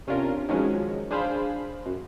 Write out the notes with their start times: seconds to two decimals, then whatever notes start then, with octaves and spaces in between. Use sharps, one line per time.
0.07 C3 C#4 D4 F4 A#4
0.49 D#3 F3 F#3 G#3 C#4
1.11 D4 G#4 C5 F5 B5
1.86 F#2